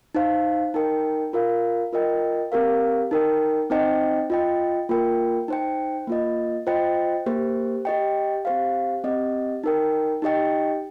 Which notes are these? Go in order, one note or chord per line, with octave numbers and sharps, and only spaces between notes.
D#4 C5 F5
D#4 A#4 G5
F4 A#4 F5
F4 A#4 D#5 G5
C4 G4 A#4 F5
D#4 A#4 G5
C4 D#4 C5 D#5 G5
F4 D#5 G5
A#3 F4 A#4 G5
D#4 C5 G5
A#3 F4 D#5
F4 C5 D#5 G5
A#3 G4 C5
G4 D#5 G5
C4 G4 C5 F5
C4 G4 D#5
D#4 A#4 G5
D#4 G4 D#5 G5